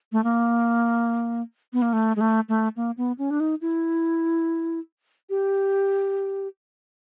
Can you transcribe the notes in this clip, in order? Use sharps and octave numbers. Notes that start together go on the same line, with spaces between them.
A3
A#3
B3
A#3
A3
G#3
A3
A3
A#3
B3
C#4
D4
D#4
E4
G4